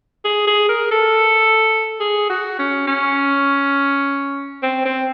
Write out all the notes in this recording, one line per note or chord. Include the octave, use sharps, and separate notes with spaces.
G#4
G#4
A#4
A4
G#4
F#4
C#4
C#4
C4
C4